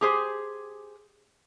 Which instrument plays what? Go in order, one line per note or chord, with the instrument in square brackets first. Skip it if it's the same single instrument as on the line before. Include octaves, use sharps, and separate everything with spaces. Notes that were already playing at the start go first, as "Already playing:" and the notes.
[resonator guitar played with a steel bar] G4 G#4 C5